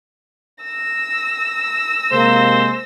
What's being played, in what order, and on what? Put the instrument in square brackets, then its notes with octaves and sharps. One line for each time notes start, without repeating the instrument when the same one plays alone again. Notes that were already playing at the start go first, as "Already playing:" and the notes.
[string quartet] E6 A#6
[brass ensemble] C3 G#3 A#3 [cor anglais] C5